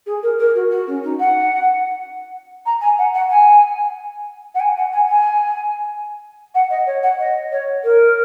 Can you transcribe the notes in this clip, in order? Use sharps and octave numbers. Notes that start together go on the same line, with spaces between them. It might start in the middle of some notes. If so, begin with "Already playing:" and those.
G#4
A#4
A#4
F#4
F#4
C#4
D#4
F#5
A#5
G#5
F#5
F#5
G#5
F#5
G#5
F#5
G#5
G#5
F#5
D#5
C#5
F#5
D#5
C#5
A#4